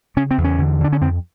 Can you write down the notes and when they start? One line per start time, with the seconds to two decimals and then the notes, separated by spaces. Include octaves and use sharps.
0.16 C#3 C#4
0.31 C4
0.38 E2
0.44 C#4
0.59 D3
0.80 D3 D4
0.92 C#4
1.01 F2 C4